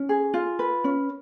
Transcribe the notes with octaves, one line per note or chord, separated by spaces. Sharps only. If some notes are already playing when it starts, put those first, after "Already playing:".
Already playing: C#4
G#4
F4
B4
C#4